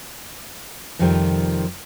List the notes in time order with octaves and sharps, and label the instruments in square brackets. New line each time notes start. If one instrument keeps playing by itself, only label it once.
[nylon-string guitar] F2 C3 D#3 F3 G3